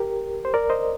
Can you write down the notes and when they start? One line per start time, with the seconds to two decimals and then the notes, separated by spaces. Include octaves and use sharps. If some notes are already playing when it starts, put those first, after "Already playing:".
Already playing: G4 A#4
0.45 C5
0.54 A#4 D5
0.70 C5 D#5